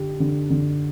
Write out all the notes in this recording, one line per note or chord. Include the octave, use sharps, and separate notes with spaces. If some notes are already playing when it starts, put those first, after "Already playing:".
Already playing: D3 G4
D3
D3